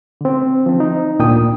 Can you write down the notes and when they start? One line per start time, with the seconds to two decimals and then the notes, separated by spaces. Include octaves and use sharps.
0.21 D3 C4
0.66 F3 C4
0.80 D#4
1.19 D2 A#2 D4 G5 D#6